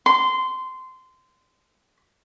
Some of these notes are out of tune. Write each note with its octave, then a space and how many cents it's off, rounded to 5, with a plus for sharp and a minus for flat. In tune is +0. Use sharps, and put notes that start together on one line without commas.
C6 -20